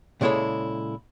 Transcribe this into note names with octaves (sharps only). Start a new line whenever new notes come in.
A#2 C#3 G#3 E4 A4 C#5